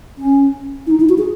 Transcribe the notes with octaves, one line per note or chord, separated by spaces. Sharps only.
C#4
E4
D#4
E4
F#4
G#4